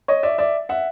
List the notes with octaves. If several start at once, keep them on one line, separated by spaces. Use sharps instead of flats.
C#5 D#5
D5 E5
D5 E5
E5 F#5